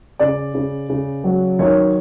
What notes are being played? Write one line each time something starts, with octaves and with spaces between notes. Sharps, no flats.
C#3 D5
C#3
C#3
F#3
D#3 C#5